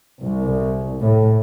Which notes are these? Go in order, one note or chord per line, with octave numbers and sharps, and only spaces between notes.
C2
A2